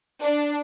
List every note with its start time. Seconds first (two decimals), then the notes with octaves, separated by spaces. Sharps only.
0.23 D4